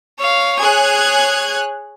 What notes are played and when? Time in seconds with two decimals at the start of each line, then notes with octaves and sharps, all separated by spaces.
0.19 C#5 F5
0.59 G#4 C#5 F#6 G#6